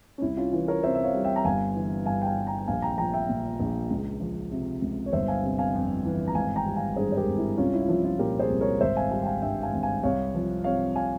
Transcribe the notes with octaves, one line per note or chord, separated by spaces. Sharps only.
C#4
C2 E4
C#4 F4
E3 E4
A#4 C#5
C3 C5 E5
E5
C#5 F5
G3
E5 G5
A#5
G1 F5 G#5
E3
G2 F5 G#5
G5
F5 G#5
G3
G5 A#5
G5
A#1 F5 G#5
G5 A#5
F3 G5 A#5
E5 G5
A#2
A#1
C#2
F3
C3
C#2
C#5
G1 C5 E5
F5 G#5
C3
F5 G#5
F2
E3
A#5
G#1 F5 G#5
G5 A#5
G3
F5 G#5
G2 G#4 C5
C5
G4 A#4
G#1
E4
C2 C#4 F4
E4
F4
F3 E4
C#4 F4
A#2 G4 A#4
G#4 C5
C2
A#4 C#5
G#1 C5 E5
F5 G#5
G3 F5 G#5
G5
F5 G#5
G2 E5 G5
F5 G#5
G#1
F5 G#5
C2 C#5 F5
F3
C3 C#5 F5
F5 G#5